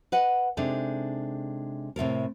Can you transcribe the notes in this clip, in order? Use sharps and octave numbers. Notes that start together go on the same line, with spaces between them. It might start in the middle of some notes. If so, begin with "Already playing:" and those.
B4 D#5 F#5
C3 G#3 D4 D#4 A4
A2 C3 A4 A#4